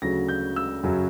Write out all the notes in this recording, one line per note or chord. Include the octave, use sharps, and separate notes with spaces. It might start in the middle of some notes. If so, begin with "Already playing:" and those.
D2 C#3 F#3 A#6
G6
E6
F#2 C#3 F#3